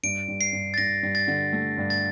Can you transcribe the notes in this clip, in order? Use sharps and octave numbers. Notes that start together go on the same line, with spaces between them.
G2 D7
G2
C7
G2
A6
G2 A#6
G2
A6
D3
A3
G2
A6